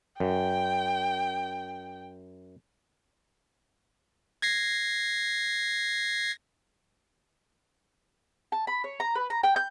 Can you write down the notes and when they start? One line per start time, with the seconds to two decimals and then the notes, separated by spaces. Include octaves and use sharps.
0.20 F#2 G5
4.42 G#6 A#6 C7
8.52 A5
8.67 B5
8.84 C#5
9.00 A#5
9.15 B4
9.30 A#5
9.43 G5
9.56 G6